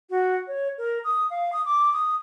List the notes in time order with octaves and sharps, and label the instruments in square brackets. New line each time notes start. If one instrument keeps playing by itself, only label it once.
[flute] F#4
C#5
A#4
D#6
F5
D#6
D6
D#6